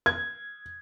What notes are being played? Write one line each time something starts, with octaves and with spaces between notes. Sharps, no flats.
G#6